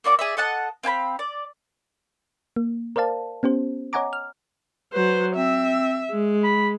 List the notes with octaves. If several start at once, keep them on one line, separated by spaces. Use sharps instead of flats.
A#3 F#4 D5 D6
G#4 D5 E5
A4 D#5 F#5 A5
C4 F5 G#5 B5
D5
A#3
A#4 C5 D5 F5 A5
B3 C#4 G4 C5
C#5 D#5 F#5 G#5 A#5 D6
F6
F#3 B4 C5
C4 E5
G#3
B5